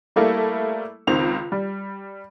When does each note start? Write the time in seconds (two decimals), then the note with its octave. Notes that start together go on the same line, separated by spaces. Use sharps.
0.16 G3 A3 A#3 E4 A4
1.07 C#2 D#3 C4 F7
1.52 G3